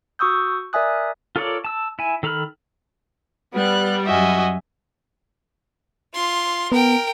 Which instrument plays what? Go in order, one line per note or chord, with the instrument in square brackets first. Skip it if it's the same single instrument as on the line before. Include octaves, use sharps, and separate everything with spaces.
[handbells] F#4 C#6 D#6 E6 G6
A#4 D5 E5 G#5 D#6 F#6
[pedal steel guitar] F4 A4 A#4 C#5 D5
A5 E6
E4 G#5
D#3 A4 A#5 B5 F6
[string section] G3 [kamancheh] B3 F#6
[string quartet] F#2 [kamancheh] F#4 D#5 [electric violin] E5 G#5
[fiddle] F4 C6
[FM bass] B3 [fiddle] A#4 G5